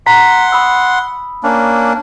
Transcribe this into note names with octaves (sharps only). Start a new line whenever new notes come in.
F#5 A#5 C6 B6
B5 D#6 E6
A#3 C#4 D4